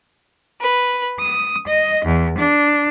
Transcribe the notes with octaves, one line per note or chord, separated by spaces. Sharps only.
B4
D#6
D#5
E2
D4